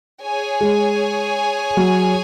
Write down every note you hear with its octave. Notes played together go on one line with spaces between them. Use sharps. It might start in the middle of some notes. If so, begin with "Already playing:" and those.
G#4 C#5 G#5
G#3
F#3